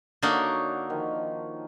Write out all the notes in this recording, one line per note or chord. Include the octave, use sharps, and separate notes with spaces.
D3 A#3 D4 D#4 F#4 C#5
D#3 F3